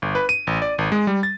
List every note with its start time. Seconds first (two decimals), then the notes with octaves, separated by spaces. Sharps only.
0.02 G1
0.15 B4
0.29 D#7
0.47 A1
0.62 D5
0.78 G#1
0.92 G#3
1.07 G3
1.23 A6